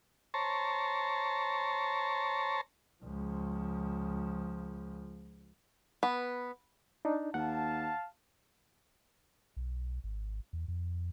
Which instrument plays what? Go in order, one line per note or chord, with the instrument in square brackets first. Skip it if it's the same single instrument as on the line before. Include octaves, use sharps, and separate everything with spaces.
[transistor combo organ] C5 C#5 A5 A#5
[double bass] C#2 F3
[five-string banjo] B3
[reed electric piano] D4 D#4
[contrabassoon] D#2 [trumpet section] F5 A5 [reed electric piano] F#5
[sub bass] B1
G#1
E2
F2